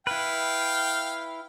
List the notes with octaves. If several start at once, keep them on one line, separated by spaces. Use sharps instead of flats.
E4 B4 F5 G5